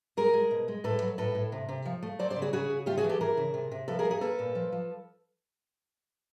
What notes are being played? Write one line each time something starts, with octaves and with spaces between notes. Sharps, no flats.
G#3 G#4 A#4
G#3
B2
G#3
A2 A4 B4
F#3
A2 A4 B4
A2
C3
C3
F3
A3
F#3 C5 D5
C5 D5
C#3
F#4 G#4
C#3 F#4 G#4
C#3
A3 F4 G4
F#4 G#4
E3
G4 A4
E3 G#4 A#4
C#3
C3
C3
F3 A4 B4
G#4 A#4
A3
G#4 A#4
A#3 A4 B4
A#2
F3
F3